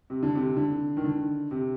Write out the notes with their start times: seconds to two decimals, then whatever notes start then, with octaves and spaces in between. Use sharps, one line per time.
0.10 C3
0.23 D3
0.35 C3
0.57 D3
0.97 D#3
1.04 D3
1.51 C3